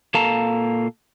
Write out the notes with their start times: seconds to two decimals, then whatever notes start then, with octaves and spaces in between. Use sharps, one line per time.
0.14 A#2 A#3 A4 F5 A5 A#5